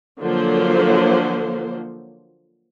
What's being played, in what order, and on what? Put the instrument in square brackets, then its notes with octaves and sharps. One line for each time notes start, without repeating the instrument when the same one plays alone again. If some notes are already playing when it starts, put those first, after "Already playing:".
[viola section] D3 F3 F#3 A#3 C5